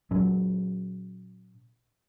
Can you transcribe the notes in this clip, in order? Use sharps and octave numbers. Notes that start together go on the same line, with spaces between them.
A#2 F#3 C#4